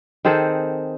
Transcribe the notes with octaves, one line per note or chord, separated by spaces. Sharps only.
D#3 C4 G#4 A4